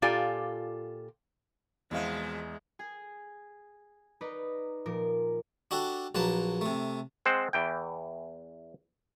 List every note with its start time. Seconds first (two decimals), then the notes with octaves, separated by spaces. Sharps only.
0.02 A#2 F4 G4 A4 D5 G#5
1.91 E2 B2 F3 G#3 C4 E4 D#5 F5
2.79 G#4 G#5
4.21 D#4 B4 D5 A#5
4.86 A#2 F3 A#4 D6
5.71 D4 F#4 G4 A4
6.15 A#1 F#3 A#3 B4 A5
6.61 C3 A3
7.25 G#3 C4 C5 F#5
7.53 E2 E3 G5